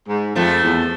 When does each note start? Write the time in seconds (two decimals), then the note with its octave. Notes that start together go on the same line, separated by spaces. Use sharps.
0.09 G#2
0.35 F2 F3 A3
0.63 E2